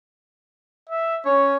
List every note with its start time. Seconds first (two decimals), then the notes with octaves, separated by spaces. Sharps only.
0.90 E5
1.25 C#4 C#5